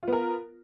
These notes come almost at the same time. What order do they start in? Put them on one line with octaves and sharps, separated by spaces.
F4 B3 A#4